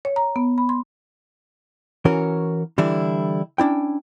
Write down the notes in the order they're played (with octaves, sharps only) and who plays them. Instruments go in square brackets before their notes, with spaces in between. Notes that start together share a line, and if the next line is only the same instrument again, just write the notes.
[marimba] C#5
A#5
B3
B5
C6
[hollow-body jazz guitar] E3 C#4 F#4 A#4
D3 E3 G3 D4 E4
C#4 D4 E4 G5